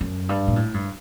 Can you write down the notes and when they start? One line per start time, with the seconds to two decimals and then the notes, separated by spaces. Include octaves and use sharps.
0.01 F#2
0.29 G2
0.48 A#2
0.56 A2
0.74 G2